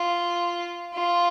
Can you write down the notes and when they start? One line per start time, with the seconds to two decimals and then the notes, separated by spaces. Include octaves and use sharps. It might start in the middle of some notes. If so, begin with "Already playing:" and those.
Already playing: F4
0.94 F4